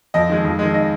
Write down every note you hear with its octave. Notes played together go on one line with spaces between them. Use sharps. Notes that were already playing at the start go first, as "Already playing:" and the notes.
F2 D#5
D#3 G#3
F2
D#3 G#3
D#5